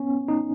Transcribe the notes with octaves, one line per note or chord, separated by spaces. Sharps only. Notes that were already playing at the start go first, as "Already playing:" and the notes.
Already playing: B3 C#4
D#4